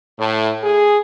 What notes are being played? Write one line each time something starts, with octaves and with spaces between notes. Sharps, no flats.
A2
G#4